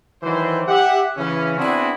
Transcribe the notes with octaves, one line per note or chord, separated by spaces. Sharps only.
D#3 E3 F#3 C5
G4 E5 F#5
C#3 E3 C#4
B3 C4 D4 E4 F#4 G#4